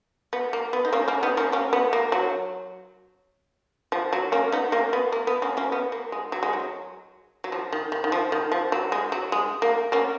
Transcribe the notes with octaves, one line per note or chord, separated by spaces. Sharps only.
B3
A#3
B3
D#4
A#3 C#4
A#3 C#4
B3 D#4
A#3 C#4
A#3 C#4
B3
A#3
F#3
F3
F#3
A#3 C#4
B3 D#4
A#3 C#4
B3
A#3
B3
A#3 C#4
A#3 C#4
B3
A#3
G#3
F#3
G#3
F#3
F#3
F3
D#3
D#3
D#3
F3
D#3
F3
F#3
G#3
F#3
G#3
A#3
A#3 C#4